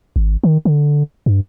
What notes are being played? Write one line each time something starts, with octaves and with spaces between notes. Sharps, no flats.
G#1
D#3
D3
G2